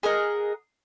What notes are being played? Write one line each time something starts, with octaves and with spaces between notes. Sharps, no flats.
G#4 A#4 D#5 F#5